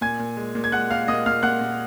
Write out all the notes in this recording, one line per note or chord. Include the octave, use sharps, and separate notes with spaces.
A#2 G#5 G#6
A#2
G#3
A#2
G#6
G#3 F#5 F#6
A#2 F5 F6
A#2 D#5 D#6
A#2 F5 F6
A#2 F#5 F#6
A#2